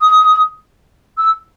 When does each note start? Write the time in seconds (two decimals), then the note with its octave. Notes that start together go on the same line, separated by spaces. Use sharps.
0.01 D#6
1.17 E6